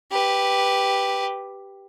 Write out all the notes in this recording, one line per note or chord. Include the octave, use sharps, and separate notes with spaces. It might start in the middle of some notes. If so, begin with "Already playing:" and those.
G4 B4